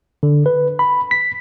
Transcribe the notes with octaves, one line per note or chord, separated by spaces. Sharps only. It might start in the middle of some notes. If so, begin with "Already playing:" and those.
D3
B4
B5
B6